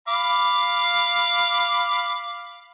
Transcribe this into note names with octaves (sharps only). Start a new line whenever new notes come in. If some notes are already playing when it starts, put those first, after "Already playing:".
F5 B5 D6